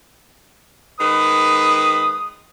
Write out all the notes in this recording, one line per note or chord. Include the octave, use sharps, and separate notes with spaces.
D#3 G#3 B4 D#6